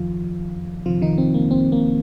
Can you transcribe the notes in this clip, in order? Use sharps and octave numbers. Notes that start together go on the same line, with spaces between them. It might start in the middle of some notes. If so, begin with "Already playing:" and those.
Already playing: F2 D#3 F3 F4
F2 C3 D#3 F3 F4
D#3 D#4
C4
A#3
C4
A#3